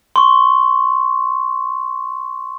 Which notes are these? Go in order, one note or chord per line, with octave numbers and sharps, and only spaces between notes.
C6 C#6